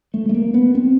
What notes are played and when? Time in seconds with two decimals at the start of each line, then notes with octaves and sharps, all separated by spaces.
0.14 A3
0.29 A3
0.34 A#3
0.54 B3
0.75 C4